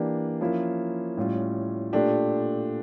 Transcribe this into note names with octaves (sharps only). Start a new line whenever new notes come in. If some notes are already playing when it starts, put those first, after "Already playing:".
Already playing: E3 A#3 D4 G4
F3 A#3 C#4 E4
A2 G3 C#4 F4
A#2 A3 D4 G4